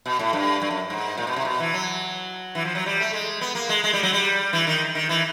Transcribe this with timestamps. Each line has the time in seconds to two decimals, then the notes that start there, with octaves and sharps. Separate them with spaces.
0.06 B2
0.19 A2
0.33 G2
0.62 G2
0.70 F#2
0.90 G#2
1.18 A#2
1.27 B2
1.36 C3
1.45 B2
1.60 E3
1.74 F#3
2.55 E3
2.65 F3
2.75 F#3
2.86 G3
3.00 A3
3.13 G#3
3.41 B3
3.55 A#3
3.69 G#3
3.84 G#3
3.93 G3
4.03 F#3
4.13 G3
4.53 E3
4.67 D#3
4.95 D#3
5.09 E3